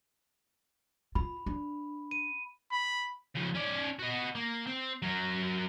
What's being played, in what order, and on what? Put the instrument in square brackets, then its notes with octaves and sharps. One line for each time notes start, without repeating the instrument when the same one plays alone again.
[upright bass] F4 [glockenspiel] B5
[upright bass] D4
[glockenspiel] D#7
[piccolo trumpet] B5
[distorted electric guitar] C#3 F3
C#4 D5
F#4 D#5
A#3
C4
F#3 A#4